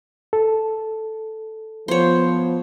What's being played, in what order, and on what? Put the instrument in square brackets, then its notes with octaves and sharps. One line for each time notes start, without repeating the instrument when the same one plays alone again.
[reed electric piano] A4
[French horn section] F3 B3 [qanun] C5 C#5